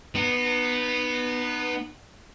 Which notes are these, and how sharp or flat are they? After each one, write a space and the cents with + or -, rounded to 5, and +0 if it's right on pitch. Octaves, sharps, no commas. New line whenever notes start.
B3 +0 D#4 -30